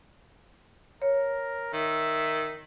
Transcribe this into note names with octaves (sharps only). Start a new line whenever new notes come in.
A#4 C#5
D#3 E5